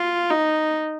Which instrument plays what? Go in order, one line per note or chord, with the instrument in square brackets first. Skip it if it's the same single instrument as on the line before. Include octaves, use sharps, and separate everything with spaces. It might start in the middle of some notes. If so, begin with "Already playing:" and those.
Already playing: [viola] F4
D#4